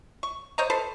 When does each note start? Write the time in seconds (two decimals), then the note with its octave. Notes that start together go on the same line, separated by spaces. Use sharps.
0.23 C#6
0.58 C5 C#5 D#5 A#5
0.70 A4 B4 C5